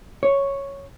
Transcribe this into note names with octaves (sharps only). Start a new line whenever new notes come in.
C#5